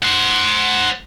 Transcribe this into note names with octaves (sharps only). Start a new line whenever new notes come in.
C5 F#5